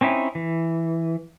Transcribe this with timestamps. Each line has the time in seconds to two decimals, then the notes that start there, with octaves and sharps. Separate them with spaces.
0.01 C4 C#4 D#4 E4
0.35 E3